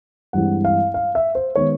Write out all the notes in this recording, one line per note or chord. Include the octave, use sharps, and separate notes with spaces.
G2 E3 G#3 C4 E4 F#5
F5
F5
E5
C5
D#3 G#3 B3 C#5